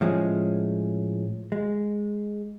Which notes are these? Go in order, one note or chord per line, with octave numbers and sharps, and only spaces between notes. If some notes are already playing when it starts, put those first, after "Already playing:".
A2 F3 G#3 C#4 G#4
G#3